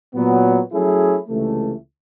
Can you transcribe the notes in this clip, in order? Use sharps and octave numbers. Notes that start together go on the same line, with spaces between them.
A#2 F#3 B3
F#3 A3 C#4 E4 G#4
C#2 C3 E3 A3